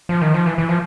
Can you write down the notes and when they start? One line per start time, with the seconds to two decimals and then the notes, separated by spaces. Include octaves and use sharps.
0.09 F3
0.22 D#3
0.34 F3
0.46 E3
0.58 E3
0.69 F3